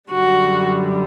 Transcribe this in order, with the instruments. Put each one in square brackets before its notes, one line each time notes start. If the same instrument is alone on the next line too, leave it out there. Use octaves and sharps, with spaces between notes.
[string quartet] F#2 D3 G3 F#4